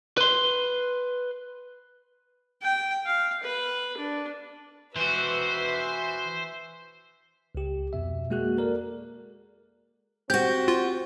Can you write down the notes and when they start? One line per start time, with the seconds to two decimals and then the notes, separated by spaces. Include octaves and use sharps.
0.17 B4 C6
2.63 G5
3.06 F5
3.43 B4
3.97 D4
4.96 E3 F#4 B4 C5 E5
7.55 C#2 G4
7.93 F2 B2 E5
8.30 G#3 A#3 F#4 G#4 F#6
8.57 A4 A#4 D5
10.30 C4 F#4 G4 G6
10.68 F4